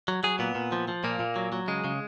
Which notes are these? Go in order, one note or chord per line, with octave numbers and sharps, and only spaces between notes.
F#3
F#3 G#4
A#2 B3
A#2
F3
F3
A#2 A#3
A#2
F#3
F#3
C#3 G#3
C#3